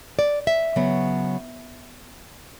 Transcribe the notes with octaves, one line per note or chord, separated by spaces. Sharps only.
D5
E5
C#3 F#3 B3